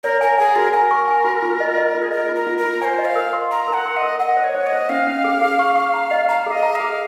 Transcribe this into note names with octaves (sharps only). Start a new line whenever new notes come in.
A#4 C#5
A#4 G#5
G#4 G#5
F#4 A#4
A#4 G#5
C#6
G#5
F#4
F4
D#5
D#5
F4
G#4
A#4 D#5
F4
A#4
F4
A#4
F4
C5 C#5 G#5
D#5
F5
A#4
C6
A#5 C6
A#4
F#5
C6
D#5
A#4
D#5 F#5
C5
C#5
C5
D#5
C5
C#4 F5
C#4
G#4
G#4
C#6
C#6
A#5
D#5
F5 A#5
G#4 D#5
A#5
G#4 F5